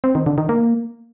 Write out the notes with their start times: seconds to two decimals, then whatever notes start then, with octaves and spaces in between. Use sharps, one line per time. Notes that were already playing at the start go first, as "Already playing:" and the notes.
0.04 C4
0.15 D#3
0.26 D3
0.38 D#3
0.49 A#3